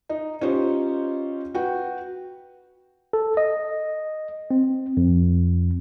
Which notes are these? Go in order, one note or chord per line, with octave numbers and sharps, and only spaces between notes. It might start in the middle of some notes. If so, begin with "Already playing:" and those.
D#4
C#4 D#4 F4 G4 C5 C#5
F#4 B4 G5
A4
D#5
C4
F2